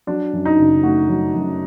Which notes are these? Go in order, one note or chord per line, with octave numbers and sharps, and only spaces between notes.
F#3 D4
F#2
D#4
F#1
A3 F#4
F#3
F#2